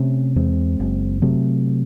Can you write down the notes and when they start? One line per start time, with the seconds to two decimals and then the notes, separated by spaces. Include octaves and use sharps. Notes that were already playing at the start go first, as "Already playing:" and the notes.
Already playing: C3 A3 C#4
0.36 E2 G#3 C4
0.80 F#1
1.22 C3 F#3 A3